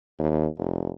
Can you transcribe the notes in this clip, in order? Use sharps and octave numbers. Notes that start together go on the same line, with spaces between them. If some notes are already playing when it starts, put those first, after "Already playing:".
D#2
F1